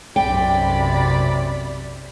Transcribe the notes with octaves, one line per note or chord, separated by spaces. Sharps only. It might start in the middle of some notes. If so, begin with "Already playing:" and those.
B1 F#2 C3 D5 G5 B5